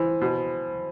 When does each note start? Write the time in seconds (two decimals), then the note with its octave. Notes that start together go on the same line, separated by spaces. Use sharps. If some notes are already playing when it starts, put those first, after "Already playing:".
Already playing: E3 C5
0.21 B2